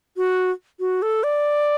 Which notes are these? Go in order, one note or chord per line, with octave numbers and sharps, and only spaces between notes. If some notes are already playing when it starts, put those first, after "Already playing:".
F#4
F#4
A4
D5